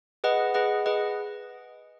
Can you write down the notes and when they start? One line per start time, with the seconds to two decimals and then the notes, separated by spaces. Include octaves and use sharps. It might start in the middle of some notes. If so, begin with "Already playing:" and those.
0.24 G#4 B4 D#5 F#5
0.54 G#4 B4 D#5 F#5
0.86 G#4 B4 D#5 F#5